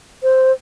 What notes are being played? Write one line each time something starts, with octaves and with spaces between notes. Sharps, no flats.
C5